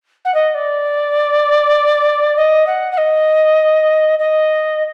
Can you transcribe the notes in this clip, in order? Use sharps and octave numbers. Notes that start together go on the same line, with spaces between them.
F#5
D#5
D5
D#5
F#5
F#5
D#5
D#5